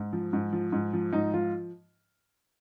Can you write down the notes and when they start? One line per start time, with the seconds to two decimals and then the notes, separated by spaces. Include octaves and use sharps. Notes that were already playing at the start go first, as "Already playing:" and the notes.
Already playing: G#2
0.13 F3
0.33 G#2
0.53 F3
0.72 G#2
0.93 F3
1.13 G#2 D#4
1.34 F3 F4